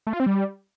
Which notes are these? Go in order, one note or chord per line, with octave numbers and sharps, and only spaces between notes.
A3
F4
C4
G3